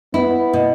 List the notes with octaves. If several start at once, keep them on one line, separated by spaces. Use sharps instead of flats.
B3 E4
B2